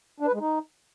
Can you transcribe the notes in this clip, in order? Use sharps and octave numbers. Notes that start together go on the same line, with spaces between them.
D4
B4
G#3
D#4